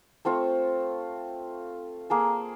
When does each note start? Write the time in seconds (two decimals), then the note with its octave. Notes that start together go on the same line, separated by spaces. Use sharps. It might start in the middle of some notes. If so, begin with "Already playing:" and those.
0.25 A3 C4 F4 C#6
2.10 A#3 G#4 A5